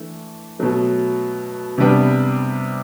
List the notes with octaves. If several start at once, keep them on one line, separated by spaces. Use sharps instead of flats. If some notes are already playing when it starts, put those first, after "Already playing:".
Already playing: E3 A3 D4
B2 F#3 A3
C3 G3 B3 D4